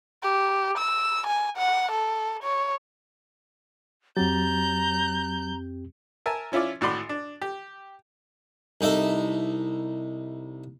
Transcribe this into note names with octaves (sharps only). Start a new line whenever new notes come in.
G4
E6
G#5
F#5
A4
C#5
F2 F#3 C4 G4 A#5 G6 A6
A#4 E5 G#5 A5
F3 C#4 E4 F4 D5
G#1 A2 F#4 D5 B5 C6
D4
G4
C2 D#4 A4 E5